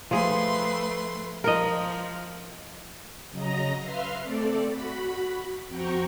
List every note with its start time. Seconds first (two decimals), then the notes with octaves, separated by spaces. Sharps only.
0.11 F3 A3 G#4 B4 C6
1.44 F3 A#4 D#5
3.30 C#3 F#3 D#5 A#5 A#6
3.81 B4 E5 F5 C6 F6
4.24 A3 C4 A4 D5
4.70 F#4 B5
5.68 F2 C4 F#4 G5 A#5 C#6